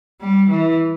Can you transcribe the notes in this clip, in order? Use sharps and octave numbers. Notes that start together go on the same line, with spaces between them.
G3
E3